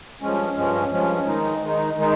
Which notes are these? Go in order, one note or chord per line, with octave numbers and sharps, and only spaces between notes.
G2 F3 G#3 C#4
G2 F3 G#3 C#4
G2 F3 G#3 C#4
D#3 G#3 D#4
D#3 G#3 D#4
D#3 G#3 D#4